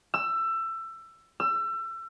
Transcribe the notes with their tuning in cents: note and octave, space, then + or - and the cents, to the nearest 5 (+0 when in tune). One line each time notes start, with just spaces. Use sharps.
E6 +20
E6 +30